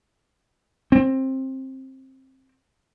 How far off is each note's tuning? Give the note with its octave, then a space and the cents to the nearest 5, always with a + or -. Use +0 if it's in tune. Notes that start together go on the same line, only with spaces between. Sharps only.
C4 +20